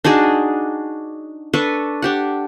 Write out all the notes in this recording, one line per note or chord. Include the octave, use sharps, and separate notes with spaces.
D4 D#4 F#4 G#4
D4 A4 B4 C#6
D4 G4 F#5